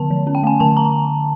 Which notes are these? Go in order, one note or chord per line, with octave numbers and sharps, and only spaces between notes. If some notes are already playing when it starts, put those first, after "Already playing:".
Already playing: D3 B3 A5
F3
C#4
G5
A3 G#5
D3 A5
A#5